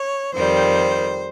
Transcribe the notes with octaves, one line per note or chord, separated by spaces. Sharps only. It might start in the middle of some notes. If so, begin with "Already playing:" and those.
Already playing: C#5
F2 D#3 G3 C5